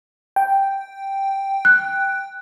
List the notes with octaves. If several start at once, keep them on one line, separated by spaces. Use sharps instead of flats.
G5
F#6